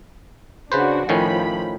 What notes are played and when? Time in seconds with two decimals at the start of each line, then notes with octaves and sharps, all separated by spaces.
0.72 C#3 D4 F#4 B4 C5
1.09 A2 D#3 F3 C#4 B5